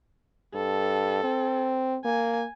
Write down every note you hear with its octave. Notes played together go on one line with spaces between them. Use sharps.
G2 A4
C4
A#3 G#5